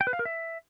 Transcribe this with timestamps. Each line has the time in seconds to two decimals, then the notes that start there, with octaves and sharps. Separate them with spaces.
0.01 G5
0.07 B4
0.13 F5
0.19 A#4
0.25 E5